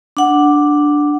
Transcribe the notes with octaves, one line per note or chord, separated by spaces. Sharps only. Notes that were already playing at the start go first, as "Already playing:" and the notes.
D4 F#5